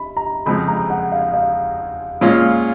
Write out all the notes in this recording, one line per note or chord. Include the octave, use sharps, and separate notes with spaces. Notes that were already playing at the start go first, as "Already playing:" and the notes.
Already playing: B5
A#5
F2 C#3 F3 G#3 B5
A#5
F#5
F5
F5
A#2 G#3 C#4 F4